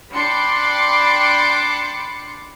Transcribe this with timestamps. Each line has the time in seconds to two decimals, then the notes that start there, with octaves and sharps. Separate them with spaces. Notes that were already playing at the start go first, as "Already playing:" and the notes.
0.12 D4 G5 B5 C6 D6 C#7